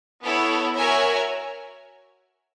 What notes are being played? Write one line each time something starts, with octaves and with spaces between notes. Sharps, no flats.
B3 E4 A4 C#5
F#4 A#4 C#5 E5 G#5